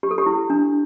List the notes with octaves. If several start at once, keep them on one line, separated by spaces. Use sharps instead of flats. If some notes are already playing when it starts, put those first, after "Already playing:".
G4
A4
G4
E4
D4